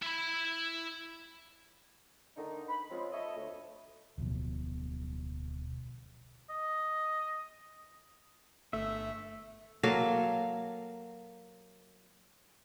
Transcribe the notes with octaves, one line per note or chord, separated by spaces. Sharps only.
E4 B5
D3 D#3 A3 D4 D#4
B5
F3 G#3 C4 C#4
A4 C#5 D#5 E5
D2
D1 B1 B2 F3
D#5
G1 A3 E5
F#3 A#3 A4 F5